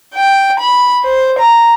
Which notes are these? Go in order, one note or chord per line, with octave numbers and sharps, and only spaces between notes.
G5
B5
C5
A#5